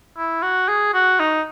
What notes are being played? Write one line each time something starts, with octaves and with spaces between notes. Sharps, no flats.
E4
F#4
G#4
F#4
D#4